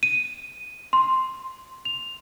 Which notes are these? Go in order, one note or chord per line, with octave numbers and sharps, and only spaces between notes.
D#7
C6
F7